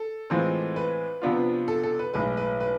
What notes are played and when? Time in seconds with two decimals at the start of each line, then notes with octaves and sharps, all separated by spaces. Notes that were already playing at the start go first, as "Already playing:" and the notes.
Already playing: A4
0.30 A2 E3 G#3 C4 F4
0.76 B4
1.22 C3 F3 B3 D4 F4
1.68 A4
1.83 A4
1.99 B4
2.14 B1 A2 G#3 B4
2.37 B4
2.60 B4